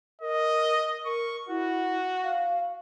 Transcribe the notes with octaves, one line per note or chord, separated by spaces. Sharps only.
A#4 D#5
A#4 C#6
E4 F#4
F5